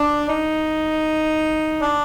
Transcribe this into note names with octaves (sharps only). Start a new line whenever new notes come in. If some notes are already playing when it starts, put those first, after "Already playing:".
Already playing: D4
D#4
D4